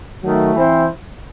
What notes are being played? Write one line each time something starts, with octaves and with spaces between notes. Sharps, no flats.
D#3 F#3 A3
E3 C4 E4 C5